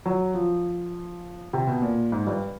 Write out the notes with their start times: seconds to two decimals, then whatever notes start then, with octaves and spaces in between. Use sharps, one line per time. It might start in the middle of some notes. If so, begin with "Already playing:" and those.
0.06 F#3
0.34 F3
1.53 C3
1.67 B2
1.82 A#2
2.12 G#2
2.27 G2